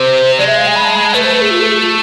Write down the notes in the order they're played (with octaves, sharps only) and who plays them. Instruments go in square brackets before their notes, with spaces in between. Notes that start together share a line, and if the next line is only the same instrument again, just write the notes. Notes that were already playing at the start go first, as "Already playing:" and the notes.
Already playing: [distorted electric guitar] C3 [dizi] C5
[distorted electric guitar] G#3 [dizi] D5
[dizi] E5
F5
G#5
B5
A5
B5
A5
[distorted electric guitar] A3 [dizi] B4
[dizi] C5
B4
G#4
F4
A4
G#4
F4